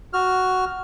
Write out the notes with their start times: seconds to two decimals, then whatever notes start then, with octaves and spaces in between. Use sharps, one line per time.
0.13 F#4 F6